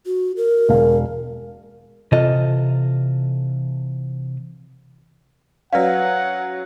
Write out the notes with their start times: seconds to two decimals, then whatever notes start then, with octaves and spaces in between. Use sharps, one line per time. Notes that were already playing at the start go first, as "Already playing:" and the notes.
0.06 F#4
0.37 A#4
0.69 E1 F5
2.12 C3 E3 F4 A4 D#5
5.73 F#3 C#4 B4 D5 F5 F#5